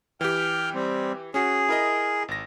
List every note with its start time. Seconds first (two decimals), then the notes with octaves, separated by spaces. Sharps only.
0.21 E3 G4 G5 F6
0.74 G3 C4
1.34 C#4 F#4 G#4
1.69 E4 A#4 D#5
2.28 G#1 A#6